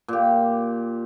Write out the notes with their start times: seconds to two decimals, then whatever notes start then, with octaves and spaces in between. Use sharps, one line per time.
0.08 A#2 G4